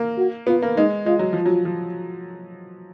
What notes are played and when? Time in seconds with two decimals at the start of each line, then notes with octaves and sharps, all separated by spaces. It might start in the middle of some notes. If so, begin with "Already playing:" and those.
Already playing: A#3
0.18 F#4
0.47 B3 F4
0.62 A#3
0.77 G#3 D#4
1.06 G#3 F4
1.19 F#3
1.33 F3 F4
1.46 F#3
1.65 F3